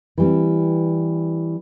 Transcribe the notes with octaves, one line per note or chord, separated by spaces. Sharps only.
E3 G3 C4